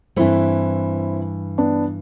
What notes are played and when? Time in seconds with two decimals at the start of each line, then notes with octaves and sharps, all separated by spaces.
0.16 G2 E3 A3 C4 E4
1.58 B3 D4